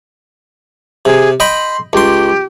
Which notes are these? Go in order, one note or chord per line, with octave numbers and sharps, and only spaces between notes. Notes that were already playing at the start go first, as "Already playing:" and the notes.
C3 G#4
D#5 G5 B5 C6
C#2 G4 C6